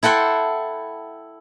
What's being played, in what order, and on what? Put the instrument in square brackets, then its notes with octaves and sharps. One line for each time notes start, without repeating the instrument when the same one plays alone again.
[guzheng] E4 A4 F#5 G5 C6